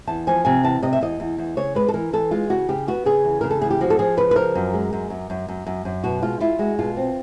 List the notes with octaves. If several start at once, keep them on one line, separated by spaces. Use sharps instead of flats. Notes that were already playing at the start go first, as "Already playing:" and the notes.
E2 A5
F3 G#5
C3 G#5
E2 A5
C3 D#5
E5
E2 D#5
E2
E2
C#3 C#5
G#3 B4
A4
E3 A#4
E3 A4
G#3 F4
C#3 F#4
C#3 G4
B3 F#4
C#3 G#4
E2
C#3 A#4
A4
E2 G#4
G4
F3 F#4
A4
F3 G#4
C#3 B4
B4
F3 A#4
F#2
G#3
F#2
F#2
F#2
F#2
F#2
F#2
B2 F#4
G#3 F4
E4 F4
G#3 F#4
B2 F4
C4